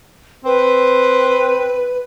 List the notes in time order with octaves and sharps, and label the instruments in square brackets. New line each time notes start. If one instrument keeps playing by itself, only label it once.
[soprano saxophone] C4 [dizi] B4